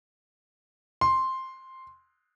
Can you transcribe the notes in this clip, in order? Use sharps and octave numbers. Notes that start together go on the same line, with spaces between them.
C6